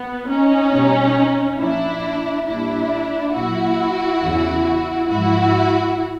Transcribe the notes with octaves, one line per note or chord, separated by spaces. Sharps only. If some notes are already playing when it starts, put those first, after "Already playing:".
Already playing: B3
C#4 D#4
B2 G3
A#2 F3 D4 E4
A#2 G3 D4 E4
A#2 F#3 E4 F#4
E2 C#3 E3
G#2 F3 E4 F#4